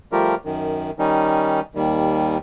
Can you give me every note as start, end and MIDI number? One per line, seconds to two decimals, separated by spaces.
0.12 0.35 53
0.12 0.35 55
0.12 0.35 57
0.12 0.35 65
0.12 0.35 67
0.12 0.35 70
0.45 0.91 42
0.45 0.91 51
0.99 1.60 51
0.99 1.60 55
0.99 1.60 61
0.99 1.60 63
1.75 2.37 39
1.75 2.37 51
1.75 2.37 55